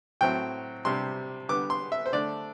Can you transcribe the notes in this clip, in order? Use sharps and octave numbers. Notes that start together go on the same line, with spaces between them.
A2 F#3 C4 E4 G5
C3 G3 D4 C6
D3 G3 B3 D6
C6
E5
C5
D3 A3 D4 D5